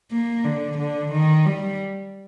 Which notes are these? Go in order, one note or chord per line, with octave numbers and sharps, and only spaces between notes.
A#3
D3
D3
D#3
G3